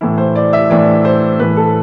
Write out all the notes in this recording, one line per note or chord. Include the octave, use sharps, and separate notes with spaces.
A2 E3 E4
C5
D5
E5
A2 E3 D5
C5
A2 E3 B4
A4